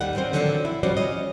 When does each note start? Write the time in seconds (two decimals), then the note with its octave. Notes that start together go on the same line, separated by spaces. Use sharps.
0.01 D#2 D#3 G3 F#5
0.15 F#3 C4 C#4 C5
0.33 D3 D#3 F3 F#3 A3 C4
0.65 E4
0.83 F3 G3 C#4 F#4 C5 D5
0.97 C#4 D#5